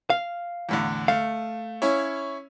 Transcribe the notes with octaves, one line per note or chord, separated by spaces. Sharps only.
F5
E2 A2 D3
A3 F5
C#4 E4 C#5